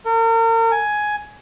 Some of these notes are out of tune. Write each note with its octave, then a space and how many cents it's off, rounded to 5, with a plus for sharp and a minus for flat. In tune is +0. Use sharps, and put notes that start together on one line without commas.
A#4 -40
G#5 +10